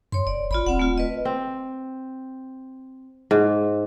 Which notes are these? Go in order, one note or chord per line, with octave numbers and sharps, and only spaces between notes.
F#2 C#5 C6
F1 D5
G#1 F4 D5 B5
D#1 C4 F#5
A3 F4
B4 D#5
C4
G#2